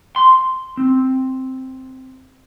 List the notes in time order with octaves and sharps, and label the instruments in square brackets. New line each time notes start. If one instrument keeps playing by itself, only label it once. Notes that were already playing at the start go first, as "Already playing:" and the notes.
[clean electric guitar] C6
C4